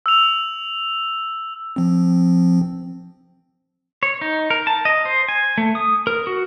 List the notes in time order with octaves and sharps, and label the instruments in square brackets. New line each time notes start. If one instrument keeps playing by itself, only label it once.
[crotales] E6 F7
[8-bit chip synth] F3 C4
[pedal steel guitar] C#5
D#4
A#4
A5
D#5
C5
G#5
A3
D#6
A#4
F#4